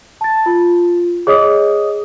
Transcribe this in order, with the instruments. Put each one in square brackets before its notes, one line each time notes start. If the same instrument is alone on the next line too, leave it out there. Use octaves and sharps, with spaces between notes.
[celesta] A5 A6
F4
G#4 C#5 D#5 D#6